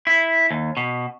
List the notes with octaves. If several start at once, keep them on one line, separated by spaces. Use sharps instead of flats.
E4
D#2
B2